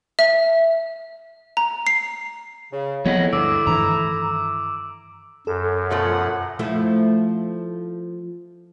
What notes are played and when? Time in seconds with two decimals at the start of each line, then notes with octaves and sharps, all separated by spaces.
0.19 E5
1.57 A#5
1.87 C7
2.72 C#3
3.05 F3 A3 B3 C4 E4 C#5 D#5 F#5
3.32 D2 G2 D6 E6 D7
3.67 G2 D#3 E3 A#5
5.47 F#2 A4
5.91 B2 F3 A3 F#5
6.59 F3 A3 E4